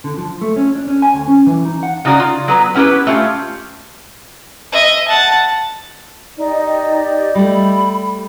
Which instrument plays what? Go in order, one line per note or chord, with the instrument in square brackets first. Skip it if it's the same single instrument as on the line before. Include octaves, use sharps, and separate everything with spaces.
[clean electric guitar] D3
F3
A3
C#4
D4
C#4
G#5
D2
C#4
E3
D#4
F#5
[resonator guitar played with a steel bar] C#3 D#4 F#4 D5 A#5
F4
F#3 B3 B4 A#5
B3 C#4 E4 F4 G4 B4
A3 C#4 F4 G4
[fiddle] D#5 E5
F#5 A5
[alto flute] D#4 [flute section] G4 D5 D#5
[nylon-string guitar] G3 A3 [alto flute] B5